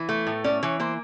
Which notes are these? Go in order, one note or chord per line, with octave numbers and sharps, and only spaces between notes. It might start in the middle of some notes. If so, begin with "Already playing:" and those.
Already playing: E3
A3
A2
C#4 D5
E3 C#5
A#3 C5